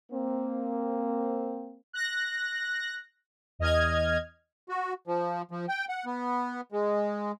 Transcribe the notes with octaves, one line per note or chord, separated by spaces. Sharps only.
A#3 C4
F#6 A#6
E2 D#5 F6 G#6
F#4
F3
F3
G5
F#5
B3
G#3